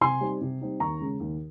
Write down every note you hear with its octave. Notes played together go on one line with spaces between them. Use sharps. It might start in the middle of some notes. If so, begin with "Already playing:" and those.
C3 G#5 C6
G3 C4 D#4
C3
G3 C4 D#4
D#2 A#5 C#6
C#3 G#3 C#4
D#2